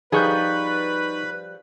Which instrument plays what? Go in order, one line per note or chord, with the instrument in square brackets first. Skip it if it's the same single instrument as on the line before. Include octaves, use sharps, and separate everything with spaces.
[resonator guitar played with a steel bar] F3 G3 G#4 [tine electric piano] D#4 C#6 G6 [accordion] B4